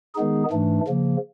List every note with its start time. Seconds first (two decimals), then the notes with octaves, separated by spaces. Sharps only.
0.15 D#3 G#3 B3 D#4 G#4
0.51 G#2 E3 A3 D4
0.88 C#3 F3 A#3